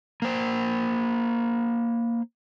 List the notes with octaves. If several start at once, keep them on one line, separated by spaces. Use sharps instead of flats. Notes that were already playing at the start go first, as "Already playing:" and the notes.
A#3 C5